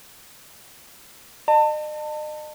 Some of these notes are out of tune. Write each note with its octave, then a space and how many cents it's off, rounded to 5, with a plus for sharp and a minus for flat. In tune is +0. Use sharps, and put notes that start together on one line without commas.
D#5 -40 A5 +30